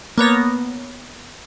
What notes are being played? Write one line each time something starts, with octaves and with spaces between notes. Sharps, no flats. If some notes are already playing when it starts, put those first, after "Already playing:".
A#3 B3 C#5 A#6